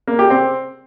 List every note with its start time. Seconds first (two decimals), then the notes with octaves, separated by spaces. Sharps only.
0.07 A#3
0.19 G4
0.30 C4